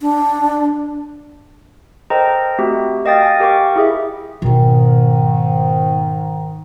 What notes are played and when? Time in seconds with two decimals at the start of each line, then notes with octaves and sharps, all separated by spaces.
0.01 D4
2.10 A4 A#4 C5 D#5 G5 A#5
2.58 A3 C4 F#4 G4
3.05 A#4 D#5 F5 G5 D#6 A6
3.23 G#5
3.40 G4 A#4 F5 G5 C#6 D6
3.76 E4 G#4 E5
4.42 G#2 B2 D#3 B3